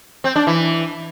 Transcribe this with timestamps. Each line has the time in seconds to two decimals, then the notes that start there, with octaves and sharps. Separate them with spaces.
0.24 C4
0.36 D4
0.47 E3